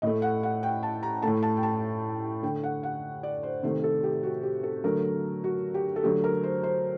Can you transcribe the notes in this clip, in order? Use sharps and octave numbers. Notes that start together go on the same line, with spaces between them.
A2 A3 D#5
F#5
F#5
G5
A5
A#5
A2 A3 A5
A5
G5
A5
D3 A3 G5
F#5
F#5
D5
C5
C3 D#3 A3 C5
A4
G4
F#4
G4
A4
D3 F#3 A3 A#4
F#4
G4
A4
D3 F#3 A3 G4
A#4
C5
C5